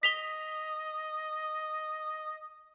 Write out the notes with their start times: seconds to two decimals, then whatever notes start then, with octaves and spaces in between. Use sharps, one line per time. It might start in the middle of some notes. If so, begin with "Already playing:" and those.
0.03 D#5 B6 F7 G7